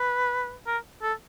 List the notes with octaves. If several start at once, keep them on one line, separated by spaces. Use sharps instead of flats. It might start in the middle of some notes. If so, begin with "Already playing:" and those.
Already playing: B4
A#4
A4